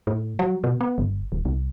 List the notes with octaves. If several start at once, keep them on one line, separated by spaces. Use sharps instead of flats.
A2
F#3
B2
B3
G1
D#1
C2